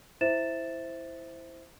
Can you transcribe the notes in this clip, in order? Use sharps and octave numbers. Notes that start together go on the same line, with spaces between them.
E4 C5 E5 A6 E7